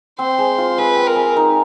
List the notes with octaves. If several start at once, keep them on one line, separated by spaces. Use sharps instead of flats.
C4 C5
G#3
F4
G#3 B4
C4
A#4
G#3
D#4